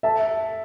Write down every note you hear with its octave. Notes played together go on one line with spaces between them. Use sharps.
E5 A5